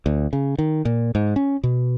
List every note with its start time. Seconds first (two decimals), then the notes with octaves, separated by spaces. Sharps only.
0.06 D2
0.33 C#3
0.58 D#3
0.85 A#2
1.15 G#2
1.36 C#4
1.63 B2